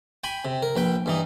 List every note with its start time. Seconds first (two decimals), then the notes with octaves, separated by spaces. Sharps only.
0.24 G5 G#5 B5
0.45 C3
0.62 A#4
0.76 A#1 B4 G5
1.06 G2 E3 D#4